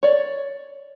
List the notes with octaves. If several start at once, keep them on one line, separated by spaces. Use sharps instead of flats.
C#5 D5